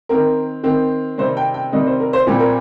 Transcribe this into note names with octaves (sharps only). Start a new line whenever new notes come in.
D#3 C4 A#4
D#3 C4
C3 D#3 G3 C4 C5
G5
G5
C3 D#3 G3 C4 D#5
C5
A#4
C5
A#2 G3 C4 G4
A#4